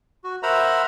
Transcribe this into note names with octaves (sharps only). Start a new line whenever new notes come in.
F#4
A#4 C5 E5 F#5 A#5 B5